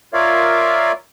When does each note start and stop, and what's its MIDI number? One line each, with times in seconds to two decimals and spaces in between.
0.14 0.92 65
0.14 0.92 70
0.14 0.92 73
0.14 0.92 74
0.14 0.92 76
0.14 0.92 77